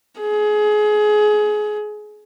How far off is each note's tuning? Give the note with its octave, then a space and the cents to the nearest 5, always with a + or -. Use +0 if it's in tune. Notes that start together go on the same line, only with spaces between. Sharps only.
G#4 +25